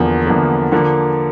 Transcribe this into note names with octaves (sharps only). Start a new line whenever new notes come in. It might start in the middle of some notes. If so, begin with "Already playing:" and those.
Already playing: E2 D3 F3 A#3
E2 D3 F3 A#3
D3 F3 A#3